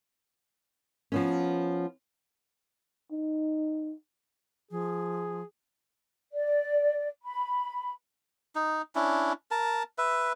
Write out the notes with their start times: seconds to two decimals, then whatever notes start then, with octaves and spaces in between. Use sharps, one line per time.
1.12 F3 B3 C#4
3.12 D#4
4.71 F3 G#4
6.32 D5
7.22 B5
8.55 D#4
8.95 C#4 D4 E4
9.51 A#4 A5
9.98 B4 E5